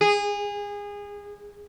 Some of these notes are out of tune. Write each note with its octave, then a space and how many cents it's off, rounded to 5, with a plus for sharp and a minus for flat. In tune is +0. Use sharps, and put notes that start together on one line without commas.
G#4 -25